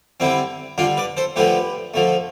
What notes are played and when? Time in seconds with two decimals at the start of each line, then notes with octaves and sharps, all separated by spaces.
0.20 D3 G3 C4 E4
0.78 D3 G3 D4 F4
0.97 B4 D5
1.17 A4 C5
1.36 D3 F3 A3 G4 B4
1.94 D3 F3 A3